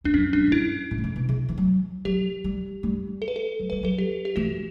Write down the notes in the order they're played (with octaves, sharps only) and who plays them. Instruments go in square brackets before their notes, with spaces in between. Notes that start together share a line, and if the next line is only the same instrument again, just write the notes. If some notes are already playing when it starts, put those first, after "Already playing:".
[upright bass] E2 [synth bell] D4
[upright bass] F#2 [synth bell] C#4
[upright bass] F#2 [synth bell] D4
[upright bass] A2
[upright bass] G2 [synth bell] E4
[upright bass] A2
D3
C#3
B2
C#3
E3
F#3
[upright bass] F#3 [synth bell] G4
[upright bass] G3
G3
[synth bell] A4
B4
A4
[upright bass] F#3
[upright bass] G3 [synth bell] B4
[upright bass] F#3 [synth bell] A4
[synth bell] G4
G4
[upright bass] E3 [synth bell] F#4